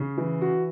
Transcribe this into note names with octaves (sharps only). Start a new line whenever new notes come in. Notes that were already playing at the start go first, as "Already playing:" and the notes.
Already playing: C#3
E3
F#4